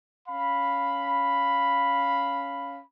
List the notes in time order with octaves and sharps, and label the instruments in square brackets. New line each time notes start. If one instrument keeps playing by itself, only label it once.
[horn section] C#4 F5 B5